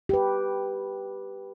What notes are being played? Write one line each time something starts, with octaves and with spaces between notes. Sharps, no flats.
G4 B4